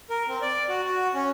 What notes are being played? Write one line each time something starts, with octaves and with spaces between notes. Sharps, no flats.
A#4
C4
D5
F#4
F#4
C#4